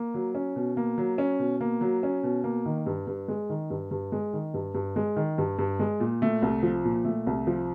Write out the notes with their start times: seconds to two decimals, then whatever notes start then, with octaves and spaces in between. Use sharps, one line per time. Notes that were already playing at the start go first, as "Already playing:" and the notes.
Already playing: A#3
0.14 F#3
0.35 C#4
0.56 B2
0.77 A#3
0.98 F#3
1.18 C#4
1.39 B2
1.61 A#3
1.81 F#3
2.03 C#4
2.23 B2
2.44 A#3
2.66 D#3
2.86 G2
3.07 G2
3.28 G#3
3.50 D#3
3.70 G2
3.91 G2
4.12 G#3
4.33 D#3
4.54 G2
4.75 G2
4.96 G#3
5.17 D#3
5.38 G2
5.59 G2
5.79 G#3
6.00 A#2
6.22 A3
6.42 C2
6.63 F3
6.85 A#2
7.05 A3
7.27 C2
7.47 F3